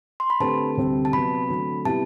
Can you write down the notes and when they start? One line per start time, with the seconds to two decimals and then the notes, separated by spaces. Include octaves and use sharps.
0.20 C6
0.30 B5
0.40 D3 A3 C4 G4 B4 A5
0.77 D2 C3 G3 C4 G4
1.05 A5
1.13 C3 F#3 B3 B5
1.49 D3 F#3 A3 C4
1.85 C3 G3 B3 E4 G4 A5